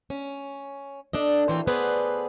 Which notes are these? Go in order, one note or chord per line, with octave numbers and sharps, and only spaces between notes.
C#4
D4 A4 D#5
D2 A#2 E3 C4 C#5 G5
B3 G#4 A4 B4 C5 D5